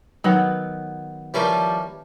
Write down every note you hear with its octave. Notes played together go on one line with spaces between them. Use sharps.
D#3 F#3 B3
E3 F3 G3 C#4 G4 A#4